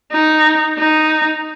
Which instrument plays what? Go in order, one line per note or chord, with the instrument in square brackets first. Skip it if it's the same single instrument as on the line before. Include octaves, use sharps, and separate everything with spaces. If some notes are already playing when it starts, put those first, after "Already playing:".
[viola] D#4
D#4